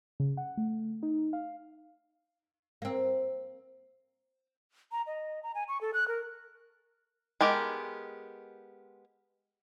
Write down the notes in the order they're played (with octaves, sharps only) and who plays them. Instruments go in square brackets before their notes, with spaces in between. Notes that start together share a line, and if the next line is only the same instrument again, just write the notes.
[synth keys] C#3
F#5
A3
D#4
F5
[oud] A#3 C4
[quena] A#5
D#5
A#5
G#5
C#6
A4
F#6
A#4
[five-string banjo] G#3 B3 G4 A#4